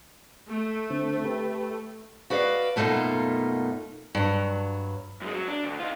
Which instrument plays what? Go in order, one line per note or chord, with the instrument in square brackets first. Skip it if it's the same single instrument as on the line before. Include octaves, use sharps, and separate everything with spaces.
[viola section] A3
[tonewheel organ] D3 C4
G4 A4 B4
[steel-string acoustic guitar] F#4 B4 D5 D#5 F5
F#2 B2 A3 A#3 D#4 F4
G2 F#3
[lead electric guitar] F#2 G#3
F#3
D4
D2
D#4 F4